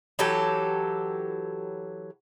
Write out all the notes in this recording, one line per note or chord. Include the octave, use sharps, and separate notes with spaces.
E3 F#3 G4 A4